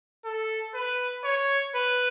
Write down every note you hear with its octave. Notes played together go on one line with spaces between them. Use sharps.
A4
B4
C#5
B4